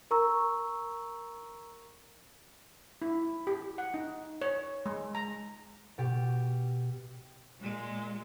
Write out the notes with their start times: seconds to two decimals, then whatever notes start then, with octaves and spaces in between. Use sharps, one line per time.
0.11 A#4 A#5 C#6 E6
3.02 E4
3.47 G4
3.78 F#5
3.94 D#4
4.42 C#5
4.86 G#3
5.15 A#5
5.98 B2 G4
7.60 A#2 G#3